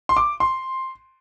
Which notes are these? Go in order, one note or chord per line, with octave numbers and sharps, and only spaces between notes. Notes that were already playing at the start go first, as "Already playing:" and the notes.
C6
D6
C6